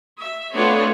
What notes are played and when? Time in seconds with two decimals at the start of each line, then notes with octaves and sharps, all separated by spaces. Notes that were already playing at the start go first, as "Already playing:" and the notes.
0.20 E5
0.55 A3 B3 C4 D4 F4 C#5